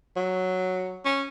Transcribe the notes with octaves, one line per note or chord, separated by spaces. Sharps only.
F#3
C#4